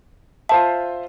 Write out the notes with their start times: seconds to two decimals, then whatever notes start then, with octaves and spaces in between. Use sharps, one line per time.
0.49 F4 C5 E5 A5